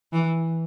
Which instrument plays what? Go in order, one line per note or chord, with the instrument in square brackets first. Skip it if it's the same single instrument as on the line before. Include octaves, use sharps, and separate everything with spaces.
[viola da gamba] E3